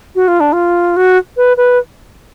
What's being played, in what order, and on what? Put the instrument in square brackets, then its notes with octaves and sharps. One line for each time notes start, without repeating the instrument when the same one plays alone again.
[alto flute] F#4
F4
D4
F4
F#4
B4
B4